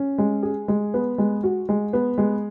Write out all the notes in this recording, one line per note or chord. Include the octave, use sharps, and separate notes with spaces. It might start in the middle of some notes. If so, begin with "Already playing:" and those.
Already playing: C#4
G#3
G#4
G#3
B3
G#3
F#4
G#3
B3
G#3